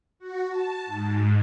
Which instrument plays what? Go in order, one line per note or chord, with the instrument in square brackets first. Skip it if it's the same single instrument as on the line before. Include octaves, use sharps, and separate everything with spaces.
[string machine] F#4
A5
G#2